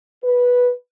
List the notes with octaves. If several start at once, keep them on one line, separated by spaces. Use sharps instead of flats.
B4